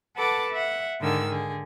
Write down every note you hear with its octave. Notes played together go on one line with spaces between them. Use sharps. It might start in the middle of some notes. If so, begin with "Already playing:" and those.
A4 B4 F#5 A5 D6
E5 F#5
G#2 D3 D#3 G#4 E6
D3 G#4